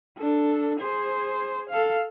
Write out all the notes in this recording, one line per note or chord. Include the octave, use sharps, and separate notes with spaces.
D4 A4
G#4 C5
A4 F5